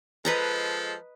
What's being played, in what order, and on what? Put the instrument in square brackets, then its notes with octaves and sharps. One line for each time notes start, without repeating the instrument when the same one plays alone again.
[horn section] F3 G#3 A4 [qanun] B4 D#5 A#5